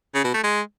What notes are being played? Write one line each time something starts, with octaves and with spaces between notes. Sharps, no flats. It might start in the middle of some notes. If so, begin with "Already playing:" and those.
C#3
B2
A3
G#3